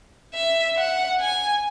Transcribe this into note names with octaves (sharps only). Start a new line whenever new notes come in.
E5
F#5
G#5